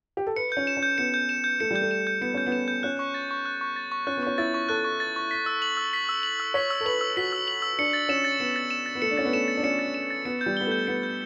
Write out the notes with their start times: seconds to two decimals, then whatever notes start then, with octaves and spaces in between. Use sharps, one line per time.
0.17 G4
0.27 A4
0.36 B4 C#7
0.52 C#4 G6
0.67 E7
0.77 C#4
0.83 G6
0.98 B3 C#7
1.14 G6
1.29 E7
1.44 G6
1.60 A3 C#7
1.71 G3 G6
1.82 A3
1.91 E7
2.07 G6
2.21 B3 C#7
2.34 C#4 G6
2.46 B3
2.52 E7
2.68 G6
2.83 C#4 F#6
2.99 C#6
3.14 A6
3.31 C#6
3.46 F#6
3.61 C#6
3.76 A6
3.92 C#6
4.07 C#4 F#6
4.17 B3
4.23 C#4 C#6
4.38 E4 A6
4.54 C#6
4.69 A4 F#6
4.85 C#6
5.00 A6
5.16 C#6
5.31 B6
5.46 E6
5.62 F#7
5.77 E6
5.93 B6
6.09 E6
6.23 F#7
6.40 E6
6.54 C#5 B6
6.70 E6
6.80 A4
6.85 B4 F#7
7.01 E6
7.17 F#4 B6
7.32 E6
7.48 F#7
7.62 E6
7.79 D4 C#7
7.93 A6
8.09 C#4 E7
8.25 A6
8.40 B3 C#7
8.56 A6
8.71 E7
8.86 A6
8.95 B3
9.02 A3 C#7
9.11 D4
9.17 C#4 A6
9.25 B3
9.33 A3 E7
9.48 A6
9.57 D4
9.63 C#4 C#7
9.79 A6
9.94 E7
10.10 A6
10.25 B3 C#7
10.41 G6
10.46 G3
10.57 B3 G7
10.67 A3 G6
10.87 B3 C#7
11.03 G6